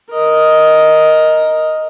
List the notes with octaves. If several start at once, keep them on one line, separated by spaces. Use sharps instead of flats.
A#4 D#5